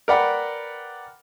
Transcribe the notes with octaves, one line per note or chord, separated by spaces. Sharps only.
A#4 B4 D5 F#5 G5 B5